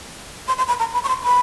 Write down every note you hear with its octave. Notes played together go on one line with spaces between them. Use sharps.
C6
C6
B5
A#5
B5
C#6
C6
B5